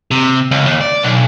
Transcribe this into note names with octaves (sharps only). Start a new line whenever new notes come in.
C3
C#2
D#2
D5
B1